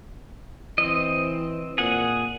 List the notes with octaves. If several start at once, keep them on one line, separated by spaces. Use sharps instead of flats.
E3 C4 D#5
A#2 G#4 F#5